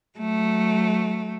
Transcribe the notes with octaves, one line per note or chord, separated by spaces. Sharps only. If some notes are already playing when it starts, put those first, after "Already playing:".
F#3 A3